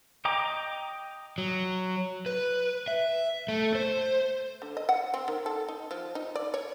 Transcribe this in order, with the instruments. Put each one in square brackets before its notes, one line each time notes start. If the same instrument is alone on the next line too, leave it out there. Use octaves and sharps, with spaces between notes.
[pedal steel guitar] D#5 G5 A#5 D6
[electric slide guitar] F#3
B4
E5
A3
C5
[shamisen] D3
D#5
F#5
C4
D#3
A4
D#4
F3
D#4
D5
C#5